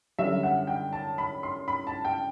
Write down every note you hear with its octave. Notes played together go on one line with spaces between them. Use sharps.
F#2 D3 G3 E5
F#5
G5
A5
B5
C6
B5
A5
G5